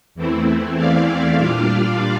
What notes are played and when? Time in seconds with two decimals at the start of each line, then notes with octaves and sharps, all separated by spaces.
0.15 E2 E3 A3 C4 E4
0.77 D5 F5
1.38 A#2 G3 D4 F4